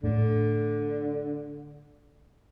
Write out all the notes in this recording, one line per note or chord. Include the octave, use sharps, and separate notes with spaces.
A2 D3